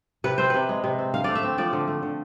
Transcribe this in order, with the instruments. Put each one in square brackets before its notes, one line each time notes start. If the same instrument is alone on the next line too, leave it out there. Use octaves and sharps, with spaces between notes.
[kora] C3 B4
C4 C5
C3 B4
G#3
C3
C4
D3 F5
A3 D5
E5
C4
F3 D5
D3
A3
D3